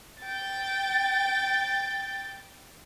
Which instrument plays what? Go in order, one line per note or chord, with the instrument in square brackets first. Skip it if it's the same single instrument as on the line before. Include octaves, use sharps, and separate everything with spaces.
[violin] G5 A6